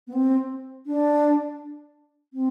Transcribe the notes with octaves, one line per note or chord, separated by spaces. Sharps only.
B3
C4
D4
C4